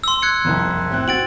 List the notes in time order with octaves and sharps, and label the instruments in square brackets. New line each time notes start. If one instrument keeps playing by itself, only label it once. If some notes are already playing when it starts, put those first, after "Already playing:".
[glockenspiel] C6 E6
F#6 G#6 C#7
[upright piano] F#1 C2 F2
A2 C4 F#6
[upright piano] C4 F#4 [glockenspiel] A6 D7 F#7